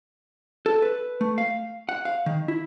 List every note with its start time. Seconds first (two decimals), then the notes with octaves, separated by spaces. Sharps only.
0.66 A4
0.82 B4
1.21 A3
1.38 F5
1.89 F#5
2.05 F5
2.26 D#3
2.48 E4